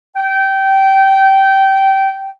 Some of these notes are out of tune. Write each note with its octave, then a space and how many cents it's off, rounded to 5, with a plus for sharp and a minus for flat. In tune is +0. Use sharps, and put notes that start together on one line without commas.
G5 -20